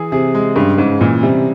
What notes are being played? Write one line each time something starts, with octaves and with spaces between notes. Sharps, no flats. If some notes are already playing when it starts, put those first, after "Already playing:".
Already playing: E3 G#4
C3 G#4
G#3
G2 C#3
G#2 C#3
A#2 E3
C3 G3